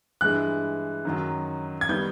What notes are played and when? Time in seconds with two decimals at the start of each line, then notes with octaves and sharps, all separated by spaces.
0.21 G2 E3 G#3 F#6
1.05 F#2 D#3 F#3
1.81 G#6
1.89 D#3 G3 B3 D#4 G6